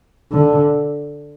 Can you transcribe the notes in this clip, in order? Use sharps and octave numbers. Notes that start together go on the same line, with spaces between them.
D3